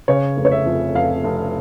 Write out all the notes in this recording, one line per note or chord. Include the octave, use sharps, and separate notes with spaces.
C#3 C#5
F1
C#5
E5
F2
F1 F5
F1